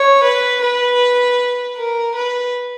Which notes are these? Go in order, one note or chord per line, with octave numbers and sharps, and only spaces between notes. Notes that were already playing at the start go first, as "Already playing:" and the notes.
Already playing: C#5
B4
B4
A#4
B4